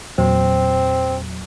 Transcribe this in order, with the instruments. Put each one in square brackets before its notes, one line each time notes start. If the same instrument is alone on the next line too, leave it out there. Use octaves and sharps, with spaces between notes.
[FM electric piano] E2 A#2 F#3 [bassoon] C4